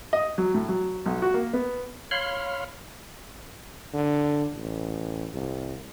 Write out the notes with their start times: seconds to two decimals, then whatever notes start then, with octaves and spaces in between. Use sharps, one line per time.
0.13 D#5
0.38 F#3
0.54 A2
0.69 F#3
1.06 B1
1.22 F#4
1.34 A#3
1.53 B3
2.11 C#5 F5 B5 C6 F6
3.94 D3
4.54 A1
5.34 C2